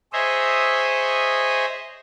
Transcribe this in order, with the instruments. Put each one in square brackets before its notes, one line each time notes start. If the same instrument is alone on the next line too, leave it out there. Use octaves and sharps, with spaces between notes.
[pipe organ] G#4 C5 C#5 D#5 E5